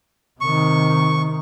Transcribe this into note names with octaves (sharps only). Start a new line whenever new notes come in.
C3 D#3 C#6